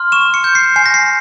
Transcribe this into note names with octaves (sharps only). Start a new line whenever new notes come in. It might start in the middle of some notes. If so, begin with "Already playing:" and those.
Already playing: C6 F6
C#6 E7
C#7
G6
C7
G#5 C7
A#6
C7